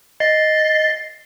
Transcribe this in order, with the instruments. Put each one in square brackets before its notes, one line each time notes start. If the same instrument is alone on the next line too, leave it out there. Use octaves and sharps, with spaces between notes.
[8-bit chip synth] D#5 A6 C7